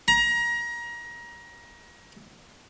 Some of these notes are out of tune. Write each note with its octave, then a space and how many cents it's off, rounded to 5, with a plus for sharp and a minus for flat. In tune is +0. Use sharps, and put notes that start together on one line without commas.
A#5 +25